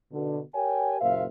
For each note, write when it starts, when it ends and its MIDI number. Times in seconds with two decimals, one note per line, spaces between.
0.12 0.40 47
0.12 0.40 50
0.54 0.98 67
0.54 0.98 70
0.54 0.98 73
0.54 0.98 79
0.54 0.98 80
1.01 1.24 30
1.01 1.24 46
1.01 1.24 70
1.01 1.24 72
1.01 1.24 76
1.01 1.24 77